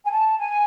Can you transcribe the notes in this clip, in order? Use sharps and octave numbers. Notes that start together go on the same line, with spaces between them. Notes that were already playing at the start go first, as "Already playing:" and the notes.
G#5
A5
G#5